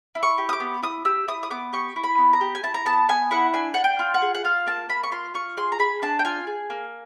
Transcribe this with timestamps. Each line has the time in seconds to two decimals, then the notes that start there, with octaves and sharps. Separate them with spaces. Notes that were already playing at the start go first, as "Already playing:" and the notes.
0.15 E4
0.23 C#6
0.38 G4
0.49 D#6
0.53 D6
0.60 B3
0.83 E4 D#6
1.05 G4 E6
1.28 E4 D#6
1.43 D#6
1.50 B3 D6
1.73 G4 C#6
1.96 E4
2.04 B5
2.18 B3
2.33 A#5
2.41 G4
2.55 G#5
2.63 E4 A5
2.74 A#5
2.85 B3 A5
3.09 B3 G#5
3.31 E4 F#5
3.54 D4 G#5
3.74 D4 F#5
3.84 G5
3.99 F4
4.14 F#5
4.22 G#4
4.35 F#5
4.44 F4 F5
4.67 A#3 A5
4.89 A#3 B5
5.03 C#6
5.12 F4 C6
5.34 F4 C#6
5.57 G#4 C6
5.72 A#5
5.79 G#4 B5
6.02 D4 A5
6.19 G5
6.25 F4 G#5
6.47 G#4
6.70 A#3